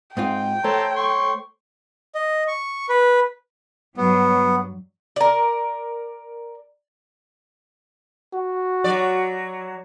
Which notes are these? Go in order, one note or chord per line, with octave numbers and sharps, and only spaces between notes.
G#2 C4 F4 G5
A3 A4 C5 C#5 A5 A#5 C6
C6 C#6
D#5
C#6
B4
G2 F#3 B3
A#4 D5
F#4
F#3 D5